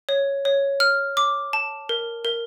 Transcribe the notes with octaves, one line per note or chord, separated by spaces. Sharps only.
C#5
C#5
F6
D6
A5
A#4
A#4